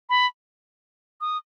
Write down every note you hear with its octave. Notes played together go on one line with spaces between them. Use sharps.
B5
D#6